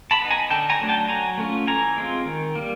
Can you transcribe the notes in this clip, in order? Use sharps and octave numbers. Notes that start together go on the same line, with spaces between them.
A5 B5
B3 D#4
G#5 A#5
D3 G5 A5
G#5 A#5
F#3 A3 D4
G5 A5
F#3 G#5 A#5
A3 C#4 F4
E3 G#5 A#5
G#3 C4 F4
D#3
G3 A#3